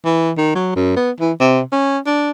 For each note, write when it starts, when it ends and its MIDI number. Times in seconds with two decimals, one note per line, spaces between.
0.05 0.31 52
0.37 0.52 51
0.55 0.75 54
0.76 0.96 42
0.96 1.11 59
1.21 1.32 52
1.40 1.62 48
1.72 1.98 61
2.06 2.31 62